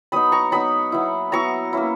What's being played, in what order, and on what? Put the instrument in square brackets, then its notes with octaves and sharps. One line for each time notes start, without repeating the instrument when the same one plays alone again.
[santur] F#3 B3 D#4 B5 D#6
A#5 C#6
F#3 B3 D#4 B5 D#6
F#3 B3 E4
F#3 B3 E4 A#5 C#6
A#3 C#4 E4